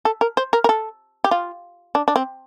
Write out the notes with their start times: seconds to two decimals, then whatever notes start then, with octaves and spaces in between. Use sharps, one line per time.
0.05 A4
0.21 A#4
0.37 C5
0.53 A#4
0.64 A#4
0.69 A4
1.24 G4
1.31 F4
1.95 D4
2.08 D4
2.16 C4